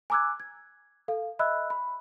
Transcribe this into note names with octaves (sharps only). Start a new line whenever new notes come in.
G#5 A#5 D6 E6 F#6 G#6
G#6
A4 F5
D#5 E5 B5 E6 F#6
B5